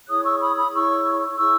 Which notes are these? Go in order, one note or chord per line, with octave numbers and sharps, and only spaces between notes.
E4 G#4 C#5 D#6 F#6
C#6 E6
B5 D#6
B5 D#6
E4 G#4 C#5 C#6 E6
E4 G#4 C#5 C#6 E6